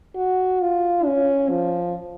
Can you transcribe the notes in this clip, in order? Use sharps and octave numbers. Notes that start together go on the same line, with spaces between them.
F#4
F4
C#4
F3